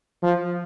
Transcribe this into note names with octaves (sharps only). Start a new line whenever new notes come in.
F3